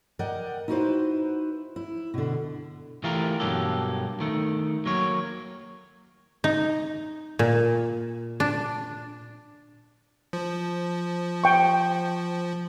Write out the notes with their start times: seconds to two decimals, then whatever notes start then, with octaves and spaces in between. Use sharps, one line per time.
0.19 A#4 D5 D#5 F#5 G5
0.68 D#4 E4 F#4 G#4 B4 C5
1.76 E4
2.14 B2 D3
3.04 E3 A3 F4 G4 A#4
3.40 G2 B2 F#3 A#3 G4 A4
4.20 D#3 A3
4.86 F#3 A#3 C#5
6.44 D#4
7.39 A#2
8.40 D4
10.33 F3
11.44 G5 C#6